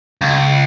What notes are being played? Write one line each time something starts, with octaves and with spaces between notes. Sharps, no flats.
C#2